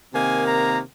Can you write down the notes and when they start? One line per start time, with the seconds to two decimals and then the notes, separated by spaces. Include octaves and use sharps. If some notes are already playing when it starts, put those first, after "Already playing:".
0.13 C3 D#3 A#3 G#5
0.47 A#5